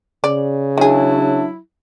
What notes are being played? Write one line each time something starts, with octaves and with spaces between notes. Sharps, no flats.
C#3 D5
D#3 F#3 D4 E4 G#4